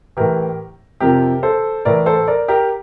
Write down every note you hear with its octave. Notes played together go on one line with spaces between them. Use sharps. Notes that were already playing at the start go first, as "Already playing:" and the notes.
A2 E3 G4 A#4
F2 C3 F3 G4 A#4
A4 C5
A2 E3 A#4 D5
A4 C5
A#4 D5
G4 A#4